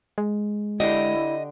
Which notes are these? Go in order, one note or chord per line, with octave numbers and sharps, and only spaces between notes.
G#3
D3 E4 G4 D#5